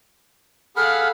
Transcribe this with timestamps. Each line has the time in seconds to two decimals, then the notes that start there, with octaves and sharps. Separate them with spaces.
0.77 G#4 A4 F5 F#5 B5 F6